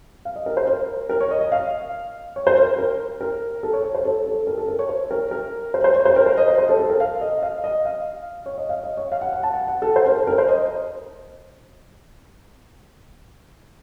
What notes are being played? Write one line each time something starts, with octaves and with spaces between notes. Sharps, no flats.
F5
D#5
A#4
C5
A#4
A#4
C#5
D#5
D#5
F5
C#5
C5
A#4
A#4
A#4
A4
C#5
C#5
C5
A4
A4
A#4
A4
A#4
C#5
C5
A#4
A#4
C5
C5
C#5
C5
A#4
C5
D#5
C5
C5
A4
A4
A#4
F5
D#5
F5
D#5
F5
C#5
D#5
F5
D#5
C#5
F5
F#5
F#5
A5
F#5
F#5
A4
C5
A#4
A4
A#4
C5
D#5